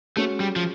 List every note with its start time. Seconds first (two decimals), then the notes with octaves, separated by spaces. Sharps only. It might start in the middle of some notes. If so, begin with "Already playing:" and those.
0.16 G#3 A3 C#4 F#4
0.40 G3
0.56 F3